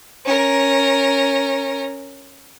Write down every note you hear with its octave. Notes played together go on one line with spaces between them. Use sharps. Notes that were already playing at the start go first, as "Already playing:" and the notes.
C#4 A#4